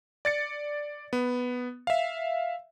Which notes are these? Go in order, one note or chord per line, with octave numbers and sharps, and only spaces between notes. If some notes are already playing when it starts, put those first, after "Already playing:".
D5 A6 C#7
B3
E5 F5